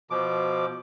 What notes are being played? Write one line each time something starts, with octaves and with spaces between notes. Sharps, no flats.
B2 F3 D6